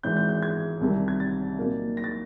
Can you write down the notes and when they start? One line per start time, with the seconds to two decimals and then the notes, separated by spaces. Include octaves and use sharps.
0.03 G#1 G#2 E3 G#3 G6
0.17 G6
0.29 G6
0.42 G#6
0.81 C2 C3 D#3 G3
1.08 G#6
1.20 A6
1.58 A#2 F#3 A#3 D#4
1.97 A#6
2.04 A6